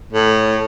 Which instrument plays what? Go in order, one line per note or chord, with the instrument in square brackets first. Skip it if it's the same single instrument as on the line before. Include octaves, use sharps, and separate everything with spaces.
[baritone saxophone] A2